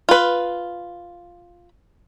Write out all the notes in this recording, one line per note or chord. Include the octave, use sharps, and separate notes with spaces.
F4 B4